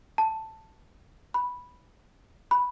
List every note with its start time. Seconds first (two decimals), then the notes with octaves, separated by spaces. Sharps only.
0.18 A5
1.34 B5
2.51 B5